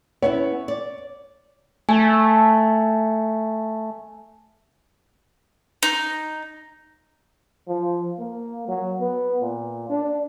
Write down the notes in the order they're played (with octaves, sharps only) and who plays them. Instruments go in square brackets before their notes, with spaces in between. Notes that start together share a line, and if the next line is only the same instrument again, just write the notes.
[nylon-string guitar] B3 C#4 E4 [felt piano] C#5
[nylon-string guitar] D5
[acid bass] A3 [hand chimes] G#5
[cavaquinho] D#4
[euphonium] F3
A#3
F#3
B3
A#2
D4